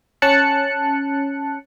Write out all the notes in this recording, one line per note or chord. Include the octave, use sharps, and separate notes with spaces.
C#4 A5 F#6 C#7